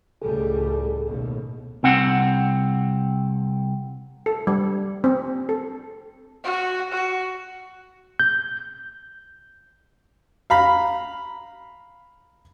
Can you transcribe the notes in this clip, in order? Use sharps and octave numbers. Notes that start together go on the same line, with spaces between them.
C#2 A2 G3 G#4 A4
A1 D#2 B2
C2 C4 F#5
A4
G3
C4
A4
F#4
F#4
G6
F5 A#5 B5